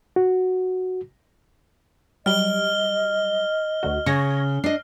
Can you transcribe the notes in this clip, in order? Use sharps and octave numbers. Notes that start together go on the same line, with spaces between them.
F#4
F#3 G3 D#5 F6 G7
D2 D3 F#4
C#3 C#6 G#6 A#6
D4 D#5 C7